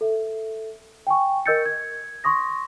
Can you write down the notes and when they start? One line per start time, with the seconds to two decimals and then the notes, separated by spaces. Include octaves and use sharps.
0.01 A4 E5
1.07 G5 G#5 C#6
1.46 A#4 D#5 E6 G6 A6 C#7
1.66 G#6
2.24 C6 C#6 D#6 A#6